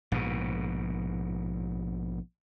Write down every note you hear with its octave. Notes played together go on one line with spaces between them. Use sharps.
A#1 G#2 B2